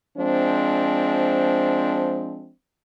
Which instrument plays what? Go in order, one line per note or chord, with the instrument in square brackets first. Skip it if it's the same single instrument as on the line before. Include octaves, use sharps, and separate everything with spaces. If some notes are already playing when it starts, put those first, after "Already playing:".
[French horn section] F3 G#3 C4 D4